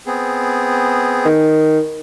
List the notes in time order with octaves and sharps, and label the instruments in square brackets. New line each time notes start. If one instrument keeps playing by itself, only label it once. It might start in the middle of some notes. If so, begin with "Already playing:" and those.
[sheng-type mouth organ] B3 C4 G#4
[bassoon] D#3